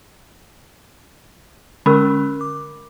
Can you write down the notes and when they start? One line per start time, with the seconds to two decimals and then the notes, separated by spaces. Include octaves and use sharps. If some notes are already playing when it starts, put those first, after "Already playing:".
1.86 D3 G#3 C#4 A#4 B5
2.41 D6